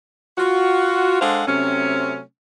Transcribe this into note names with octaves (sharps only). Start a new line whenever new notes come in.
F4 F#4
G#3 D4 A4 C5 F5 F#5
C3 F#3 A3 C4 C#4